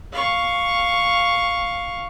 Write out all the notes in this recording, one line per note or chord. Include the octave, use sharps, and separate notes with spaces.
F5 C#6